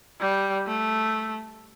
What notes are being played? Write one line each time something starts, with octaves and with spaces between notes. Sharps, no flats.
G3
A3